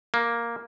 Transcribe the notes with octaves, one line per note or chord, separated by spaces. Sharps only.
A#3